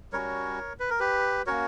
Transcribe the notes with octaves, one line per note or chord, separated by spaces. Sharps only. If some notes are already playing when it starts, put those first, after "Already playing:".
G3 C#4 F#4 A#4 C#5
B4
A#4
G4 B4
A#3 C#4 F#4 A#4 C#5